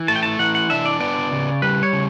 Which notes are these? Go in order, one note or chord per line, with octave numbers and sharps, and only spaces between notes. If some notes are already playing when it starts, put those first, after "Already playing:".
Already playing: E3
A3 A5
G5
A5
E3 F#5
F#5
D4 E5
D5
B3 D5
C#3
G3 B4
C#5
C#3